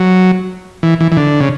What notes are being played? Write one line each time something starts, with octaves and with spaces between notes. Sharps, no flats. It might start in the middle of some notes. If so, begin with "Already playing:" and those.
Already playing: F#3
E3
E3
E3
D3
C#3